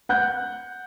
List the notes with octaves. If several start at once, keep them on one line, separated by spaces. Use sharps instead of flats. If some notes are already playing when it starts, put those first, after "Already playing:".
F#5 F#6 G6